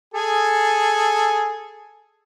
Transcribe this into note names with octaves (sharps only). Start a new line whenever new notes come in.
G#4 A4 G#5